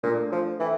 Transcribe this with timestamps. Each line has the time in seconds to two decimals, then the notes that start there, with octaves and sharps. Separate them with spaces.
0.03 A#2 A3 D4 A4
0.32 F3
0.59 E3 A4 E5 G5